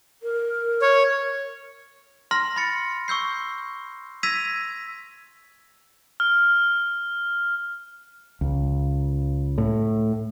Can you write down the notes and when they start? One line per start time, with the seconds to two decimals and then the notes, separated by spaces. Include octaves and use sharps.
0.23 A#4
0.82 C#5
2.31 A#5 C6 F6 A#6
2.56 B5 C6 A6 C#7
3.08 C#6 E6 G6 C7
4.23 E6 G#6 A#6 B6 D#7 F7
6.20 F6
8.41 C#2
9.58 A2